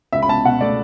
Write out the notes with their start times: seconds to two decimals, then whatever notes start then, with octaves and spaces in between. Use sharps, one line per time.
0.13 C#2 E5
0.22 B5
0.28 C#2 A5
0.45 B2 F#5
0.61 A3 D5